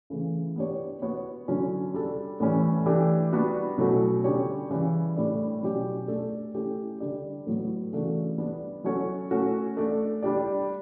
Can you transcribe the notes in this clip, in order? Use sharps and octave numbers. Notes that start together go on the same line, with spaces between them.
C#3 E3 A3
B3 D4 G4 C#5
B3 F#4 C#5
D3 F#3 C#4 F#4
G3 D4 A4
A2 E3 G3 C#4
E3 A3 D4 G4
G3 B3 D4 F#4
B2 F#3 A3 C#4 F#4
D3 G3 C#4 G4 C#5
C#3 E3 G3 C#4
A2 G3 D4 A4 D5
B2 F#3 C#4 G4 D5
A3 D4 A4 D5
A3 C#4 E4 G4
D3 G3 D4 G4 D5
A2 F#3 B3
C#3 E3 A3 D4 F#4
G3 B3 D4
F#3 C#4 F#4 A4 C#5
A3 C#4 F#4
A3 D4 A4 D5
G3 D4 G4 D5